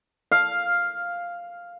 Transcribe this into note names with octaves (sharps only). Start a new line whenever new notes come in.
F5